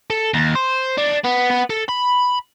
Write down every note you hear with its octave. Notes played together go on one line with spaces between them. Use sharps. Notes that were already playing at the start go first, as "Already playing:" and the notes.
A4
D#2
C5
D4
B3
B3
A4
B5